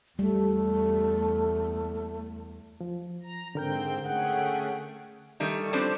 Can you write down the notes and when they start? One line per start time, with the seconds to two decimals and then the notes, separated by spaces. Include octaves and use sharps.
0.19 E2 G3 A3
2.81 F3
3.23 A#5
3.55 G#2 D3 C4 A#4 G5 G6
4.06 A3 C#4 G#4 F#5 G5
5.40 D#3 G3 A3
5.73 F3 G3 C4 D4 A4 C5